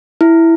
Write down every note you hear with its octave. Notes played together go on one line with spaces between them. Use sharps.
E4